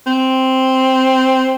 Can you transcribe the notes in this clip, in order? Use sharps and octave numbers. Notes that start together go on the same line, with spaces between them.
C4